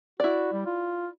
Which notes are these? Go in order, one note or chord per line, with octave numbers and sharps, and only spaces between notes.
E4 F#4 D5
G3
F4